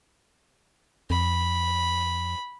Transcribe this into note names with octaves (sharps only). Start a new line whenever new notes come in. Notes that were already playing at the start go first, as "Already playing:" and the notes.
F2 B5